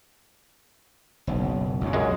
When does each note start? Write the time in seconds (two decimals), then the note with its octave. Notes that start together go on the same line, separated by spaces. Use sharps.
1.27 F#1 B1
1.81 C#2 G2
1.93 F#2 G#3